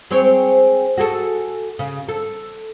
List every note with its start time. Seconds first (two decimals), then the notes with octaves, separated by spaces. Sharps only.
0.11 G#3 C4 C#5
0.98 F#4 G#4 A4
1.79 C#3
2.09 A4